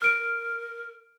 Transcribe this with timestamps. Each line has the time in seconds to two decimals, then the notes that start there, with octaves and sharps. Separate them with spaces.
0.02 A#4 F6 D7